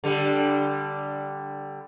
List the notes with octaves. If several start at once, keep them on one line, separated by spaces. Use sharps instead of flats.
D3 G3 G4